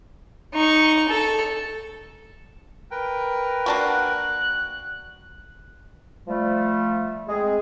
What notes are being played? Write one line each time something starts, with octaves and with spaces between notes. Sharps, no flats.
D#4 C#6
A4
A#4 B4 G5
A#3 D4 F#4 F#6
F3 G3 A3
G#3 C4 G#4